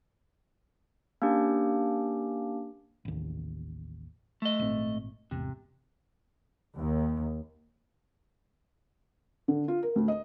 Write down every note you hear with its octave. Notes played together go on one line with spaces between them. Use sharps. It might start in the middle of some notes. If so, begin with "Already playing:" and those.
A#3 C#4 D4 G4
A1 D#2
A3 D#5
G#1 A#2 C4
G#1 E2 C3
D#2
D3
F4
A#4
D2
D#5